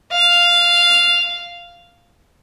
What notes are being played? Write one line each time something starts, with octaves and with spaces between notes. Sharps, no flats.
F5